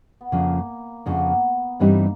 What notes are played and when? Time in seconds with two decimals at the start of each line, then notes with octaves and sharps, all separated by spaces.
0.21 B3
0.32 F2 C#3 F3 A#3
1.06 F2 C#3 F3 B3
1.16 A#3
1.26 B3
1.80 G2 E3 G3 A#3 C4 D#4